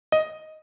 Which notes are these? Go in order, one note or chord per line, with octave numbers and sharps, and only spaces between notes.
D#5